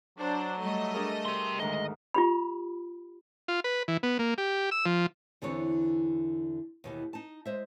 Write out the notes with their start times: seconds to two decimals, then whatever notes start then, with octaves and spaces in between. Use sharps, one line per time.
0.19 F#3 D4 C5
0.61 G3 A3 D#5
0.94 D4 G#4 A#4
1.25 G4 C6
1.60 D2 G#2 D#3 G#3 D#5
2.14 F4 G4 B5
3.48 F4
3.64 B4
3.88 E3
4.03 B3
4.19 A#3
4.38 G4
4.71 E6
4.86 F3
5.42 E2 D3 E3 C4 C#5
6.84 D#2 B2 E3
7.13 D#4 A5
7.46 G#3 C5 E5